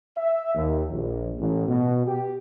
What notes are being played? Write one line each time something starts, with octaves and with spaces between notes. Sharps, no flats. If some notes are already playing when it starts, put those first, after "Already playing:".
E5
D#2
A#1
A1
B2
G4